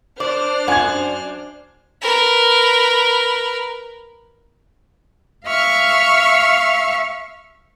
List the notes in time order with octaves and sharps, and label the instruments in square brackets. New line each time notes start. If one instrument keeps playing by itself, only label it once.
[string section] D4 C5 F6 [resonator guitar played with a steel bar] D5
[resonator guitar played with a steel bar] F#2 F#5 [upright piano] G#5 G#6
[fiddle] A#4 B4
[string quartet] E5 F5 C#6 E6 F6